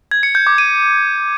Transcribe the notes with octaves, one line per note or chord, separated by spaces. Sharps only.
G#6
C#7
G6
D6
D#7